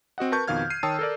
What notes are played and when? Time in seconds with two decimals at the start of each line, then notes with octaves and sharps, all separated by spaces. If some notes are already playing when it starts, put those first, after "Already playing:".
0.18 C4 F#4 D#5 F#5
0.32 A#4 B4 A5 C#6 G6
0.47 F2 B2 D#3 F5 F6 G#6
0.70 C7 D#7
0.83 D#3 C#5 G5 A5 D#6 E6
0.99 A4 A#4 D5